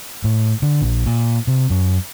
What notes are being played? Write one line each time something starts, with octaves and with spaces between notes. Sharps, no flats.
A2
D3
A#1
A#2
C3
F#2